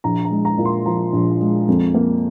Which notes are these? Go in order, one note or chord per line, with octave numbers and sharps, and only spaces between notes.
A#1 A#5
A#5
G#3
A#5
A#2
C6
F3 A#5
A#1
G#3
F2
A#3